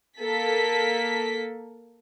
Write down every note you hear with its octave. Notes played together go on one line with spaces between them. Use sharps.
A#3 A4 B6